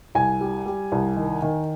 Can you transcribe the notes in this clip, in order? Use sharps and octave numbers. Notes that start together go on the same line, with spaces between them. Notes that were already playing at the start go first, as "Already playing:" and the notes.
C2 G#5
G3
G3
C2
D#3
D#3